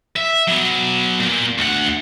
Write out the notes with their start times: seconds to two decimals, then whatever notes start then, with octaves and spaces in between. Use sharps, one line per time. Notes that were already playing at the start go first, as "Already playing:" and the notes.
0.16 E5
0.48 F#3 B3
1.20 A#2
1.58 D2 F#5